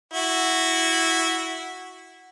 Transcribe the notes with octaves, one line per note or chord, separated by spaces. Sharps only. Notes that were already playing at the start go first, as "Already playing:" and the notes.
E4 F#4